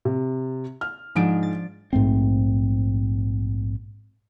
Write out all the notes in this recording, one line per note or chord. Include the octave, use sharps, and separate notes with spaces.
C3
F6
G#2 F3 G#3 D4 D7
A6
A#1 G#2 A3 C4